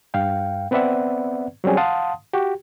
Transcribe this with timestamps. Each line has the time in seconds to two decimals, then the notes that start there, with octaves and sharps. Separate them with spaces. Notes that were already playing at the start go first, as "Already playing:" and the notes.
0.14 G2 F5 G5
0.71 B3 C4 B4 D5 E5 F#5
1.64 F#3 G3 C4 C#4 G#4
1.77 F5 F#5 A5 C6 D#6
2.33 F#4 G4